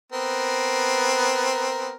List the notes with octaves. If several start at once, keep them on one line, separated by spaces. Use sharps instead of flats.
B3 C4 A#4